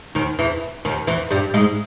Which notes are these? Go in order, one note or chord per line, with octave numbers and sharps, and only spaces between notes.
D#2 D#3
E2 E3
D#2 D#3
E2 E3
G2 G3
G#2 G#3